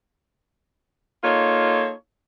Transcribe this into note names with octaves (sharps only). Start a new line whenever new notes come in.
A#3 D#4 F4 A4 C#5